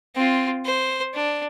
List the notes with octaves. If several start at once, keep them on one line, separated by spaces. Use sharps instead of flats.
C4 F4
C5
D4